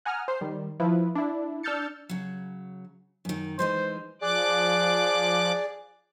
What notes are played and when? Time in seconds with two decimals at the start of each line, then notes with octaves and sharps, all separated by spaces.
0.05 F#5 G#5 A#5 D#6 F6
0.28 C5 C7
0.41 D#3 G3
0.80 F3 E4 B4
1.15 D4 E4
1.63 D4 E6 F6 G6 A6 C#7
2.09 C#3 F#3
3.25 F#2 D#3
3.59 E3 G#3 D#4 C5
4.22 F3 G#4 D5 D6 F#6